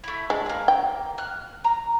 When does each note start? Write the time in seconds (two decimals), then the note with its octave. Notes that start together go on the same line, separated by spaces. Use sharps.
0.04 A3 E4
0.30 G#3 D4
0.46 A#3 C4
0.68 G5
1.18 F6 F#6
1.64 A#5